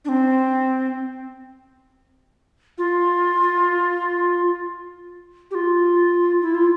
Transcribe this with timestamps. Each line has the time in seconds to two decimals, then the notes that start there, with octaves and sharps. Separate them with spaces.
0.05 D4
0.09 C4
2.78 F4
5.51 G4
5.55 F4
6.42 E4
6.54 F4